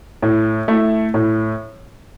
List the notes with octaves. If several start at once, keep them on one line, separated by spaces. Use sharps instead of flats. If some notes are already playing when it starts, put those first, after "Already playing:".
A2
A3 E4
A2